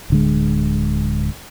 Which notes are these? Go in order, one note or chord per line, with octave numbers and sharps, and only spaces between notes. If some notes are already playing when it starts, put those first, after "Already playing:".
D1 D3 G#3